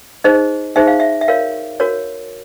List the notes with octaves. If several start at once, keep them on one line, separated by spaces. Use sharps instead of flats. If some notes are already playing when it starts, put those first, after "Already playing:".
D#4 G#4 C5 D#5
D#4 G#4 C5 E5
F5
E5
E5
F#4 A#4 C#5 F5
F#4 A#4 C#5